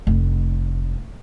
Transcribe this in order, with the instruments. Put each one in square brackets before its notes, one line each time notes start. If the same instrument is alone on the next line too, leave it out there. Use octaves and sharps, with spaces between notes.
[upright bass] F1